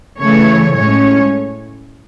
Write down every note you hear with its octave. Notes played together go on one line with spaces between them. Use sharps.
C#3 E3 A3 C#5
A2 G#3 C#4 C#5